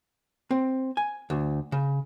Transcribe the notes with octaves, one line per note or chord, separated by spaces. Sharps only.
C4
G#5
D2
C#3